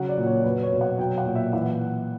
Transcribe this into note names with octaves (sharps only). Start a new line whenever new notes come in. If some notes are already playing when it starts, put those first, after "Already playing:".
Already playing: C#3 F#3 F#5
D5
A#2
C#5
F#3 B4
C#5
B2
F#5
F#3 G5
F#5
A#2
E5
E3 F#5